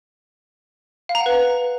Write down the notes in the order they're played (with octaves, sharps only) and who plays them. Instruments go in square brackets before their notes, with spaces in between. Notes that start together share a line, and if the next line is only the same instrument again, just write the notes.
[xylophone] F5
A#5
F#5
B4